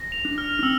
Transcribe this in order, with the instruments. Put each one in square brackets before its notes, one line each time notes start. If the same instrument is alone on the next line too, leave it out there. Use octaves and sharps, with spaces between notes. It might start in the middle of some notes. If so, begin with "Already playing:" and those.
Already playing: [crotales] A#6
F7
[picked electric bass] D4
[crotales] F6
[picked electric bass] D4
[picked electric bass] C4 [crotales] E6